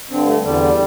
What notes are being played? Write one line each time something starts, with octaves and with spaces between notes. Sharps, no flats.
G2 D3 C4
A3
E2 D3 G3